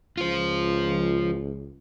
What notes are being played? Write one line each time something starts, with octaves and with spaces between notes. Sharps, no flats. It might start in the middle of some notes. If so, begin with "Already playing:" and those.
C#2 F4 C5